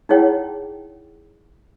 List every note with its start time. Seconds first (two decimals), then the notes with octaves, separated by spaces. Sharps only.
0.09 D#4 E4 G#4 C#5 F#5 G5